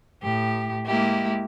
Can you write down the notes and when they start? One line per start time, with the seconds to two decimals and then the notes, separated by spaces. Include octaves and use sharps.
0.22 A2 G4
0.86 G#3 A#3 E4 G4